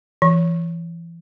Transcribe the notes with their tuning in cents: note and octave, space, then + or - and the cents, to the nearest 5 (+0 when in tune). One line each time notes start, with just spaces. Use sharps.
E3 +30 B5 -20